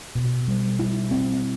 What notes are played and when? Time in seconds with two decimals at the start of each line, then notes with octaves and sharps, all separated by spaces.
0.15 B2
0.48 G3
0.79 E4
1.11 C4